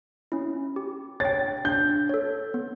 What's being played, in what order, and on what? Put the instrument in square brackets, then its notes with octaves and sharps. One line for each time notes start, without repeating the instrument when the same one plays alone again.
[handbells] C#4 E4
G4
[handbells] C#5 G5 [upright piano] A6
[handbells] D4 [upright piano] G6
[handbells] A4 C#5
B3